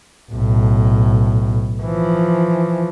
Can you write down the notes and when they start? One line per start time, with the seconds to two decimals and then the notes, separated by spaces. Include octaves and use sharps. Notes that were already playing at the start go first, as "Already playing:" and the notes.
0.31 B1 A2
1.83 E3 F3